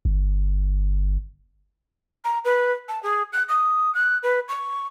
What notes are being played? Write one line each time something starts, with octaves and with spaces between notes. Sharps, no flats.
G1
A#5
B4
A5
G#4
F#6
D#6
F#6
B4
C#6